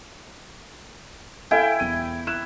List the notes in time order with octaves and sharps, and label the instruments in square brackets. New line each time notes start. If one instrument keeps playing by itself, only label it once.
[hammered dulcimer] E4 G5 [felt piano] A4 F5 G#5
[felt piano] E1 D#7
[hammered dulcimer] E4 [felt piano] F#6 E7